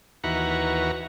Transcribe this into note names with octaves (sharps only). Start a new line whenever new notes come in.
D#2 E3 F#4 B4 A#5 C#6